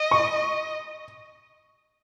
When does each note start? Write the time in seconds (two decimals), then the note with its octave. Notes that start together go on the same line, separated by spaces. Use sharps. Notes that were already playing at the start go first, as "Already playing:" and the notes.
Already playing: D#5
0.11 C#6